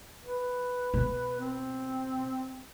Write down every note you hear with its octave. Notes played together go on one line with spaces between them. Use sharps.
B4
B2
C4